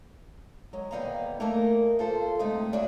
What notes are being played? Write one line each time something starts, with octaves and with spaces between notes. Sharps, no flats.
F#3 G#3
D#2 D3 G3 B3 F5 A#5
A3 A#3 D#4 G#4 A#4
F4 A4 C5
D#2 C3 G#3 A3 D#4
C#3 D4 F#4 G#4 E5